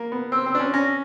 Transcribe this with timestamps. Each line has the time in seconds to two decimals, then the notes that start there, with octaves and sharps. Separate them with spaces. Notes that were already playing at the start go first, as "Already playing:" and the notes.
Already playing: A#3
0.12 B3
0.32 C4 E6
0.46 C4
0.55 D4
0.60 C#4
0.73 C#4 A#6